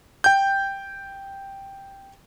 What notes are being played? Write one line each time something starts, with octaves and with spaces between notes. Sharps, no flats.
G5 G6